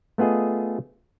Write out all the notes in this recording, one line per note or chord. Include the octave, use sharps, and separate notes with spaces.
A3 B3 F4 G#4 D#5